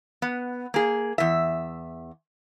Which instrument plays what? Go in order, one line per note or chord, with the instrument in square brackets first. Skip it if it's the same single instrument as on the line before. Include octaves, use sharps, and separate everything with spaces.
[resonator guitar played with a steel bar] B3
A#3 G#4
E2 E5